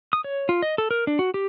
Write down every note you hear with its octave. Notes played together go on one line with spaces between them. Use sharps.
D#6
C#5
F4
D#5
A4
A#4
D4
F#4
G4